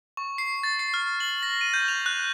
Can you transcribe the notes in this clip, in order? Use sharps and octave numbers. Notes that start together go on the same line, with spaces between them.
C#6
C7
A6
C7
F6
F#7
A#6
D#7
G6
F7
F#6